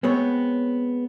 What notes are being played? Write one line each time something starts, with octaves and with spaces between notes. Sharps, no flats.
G#3 B3 C4 C#5